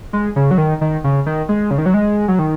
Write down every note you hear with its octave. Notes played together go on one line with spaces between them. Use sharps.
G#3
C#3
F#3
D#3
D#3
C#3
D#3
G#3
C#3
D#3
F#3
G#3
F#3
D#3